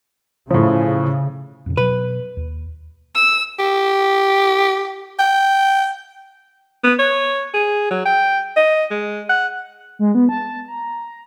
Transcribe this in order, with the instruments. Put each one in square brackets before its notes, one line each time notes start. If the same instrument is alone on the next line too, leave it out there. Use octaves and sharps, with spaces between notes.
[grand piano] A2 F3 [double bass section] C#3
[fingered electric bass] F2 A#2 C#3
[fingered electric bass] B2 F#3 [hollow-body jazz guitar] B4
[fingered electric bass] D#2
[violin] E6
[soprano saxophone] G4
G5
[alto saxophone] B3
C#5
G#4
F#3
G5
D#5
G#3
F#5
[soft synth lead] G#3
B3
A5
A#5